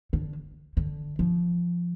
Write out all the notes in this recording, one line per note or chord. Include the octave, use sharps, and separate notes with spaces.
D3
D3
F3